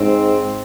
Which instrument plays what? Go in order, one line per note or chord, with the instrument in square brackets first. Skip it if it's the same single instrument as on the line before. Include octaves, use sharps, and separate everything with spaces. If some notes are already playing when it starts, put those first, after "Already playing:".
Already playing: [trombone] G#2 [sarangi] C4